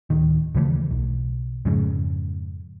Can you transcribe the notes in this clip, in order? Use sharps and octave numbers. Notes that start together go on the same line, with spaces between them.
D1 D#3
D#2 C#3 E3 A3
B1
F2 G#2 C#3